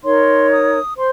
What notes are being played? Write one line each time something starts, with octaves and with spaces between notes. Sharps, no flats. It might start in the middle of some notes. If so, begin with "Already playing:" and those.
D#4 A#4 C#5 C6
D#6
C5 C6